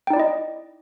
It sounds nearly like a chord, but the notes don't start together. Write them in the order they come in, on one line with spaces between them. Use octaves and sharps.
G5 D#4 D5 E4 D#5